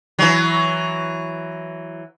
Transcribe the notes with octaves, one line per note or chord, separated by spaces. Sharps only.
E3 F#3